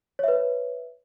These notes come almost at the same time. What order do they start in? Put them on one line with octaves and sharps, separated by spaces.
C#5 E5 B4